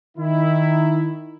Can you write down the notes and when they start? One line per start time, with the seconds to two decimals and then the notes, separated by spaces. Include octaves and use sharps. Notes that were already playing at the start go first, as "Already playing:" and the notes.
0.18 D#3 E4